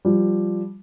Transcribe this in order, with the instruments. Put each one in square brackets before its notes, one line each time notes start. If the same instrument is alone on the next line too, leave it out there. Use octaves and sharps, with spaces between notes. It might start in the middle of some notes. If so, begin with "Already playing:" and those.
[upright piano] F3 G3